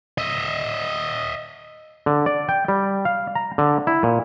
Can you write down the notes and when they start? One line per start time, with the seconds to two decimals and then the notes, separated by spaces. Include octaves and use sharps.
0.18 D#5 E5
2.06 D3
2.26 D5
2.49 G5
2.68 G3
3.05 F5
3.35 A#5
3.58 D3
3.87 E4
4.03 A#2